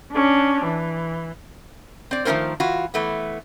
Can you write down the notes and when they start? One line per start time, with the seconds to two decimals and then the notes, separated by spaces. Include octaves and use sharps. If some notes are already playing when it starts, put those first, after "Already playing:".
0.12 C#4 D4
0.65 E3
2.11 C4 D5
2.25 D#3 F3 A3 C#4 A#4 C5
2.60 E3 F4 F#4
2.94 E3 A3 B3